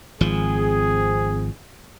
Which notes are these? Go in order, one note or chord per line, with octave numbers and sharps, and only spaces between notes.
G#1 F3 C4 G#4